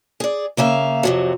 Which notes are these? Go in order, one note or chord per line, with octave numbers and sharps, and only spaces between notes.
G#4 D5
C#3 A#3 E5 F5
F2 C3 F#3